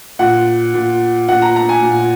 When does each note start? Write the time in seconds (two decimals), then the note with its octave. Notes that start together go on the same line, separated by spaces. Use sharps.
0.19 A#2 F#5
0.74 A#2
1.28 A#2 F#5
1.42 A#5
1.56 A#5
1.69 G#5
1.82 A#2